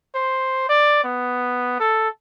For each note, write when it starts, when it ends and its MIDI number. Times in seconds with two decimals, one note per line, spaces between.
0.15 0.65 72
0.69 1.03 74
1.04 1.76 59
1.80 2.08 69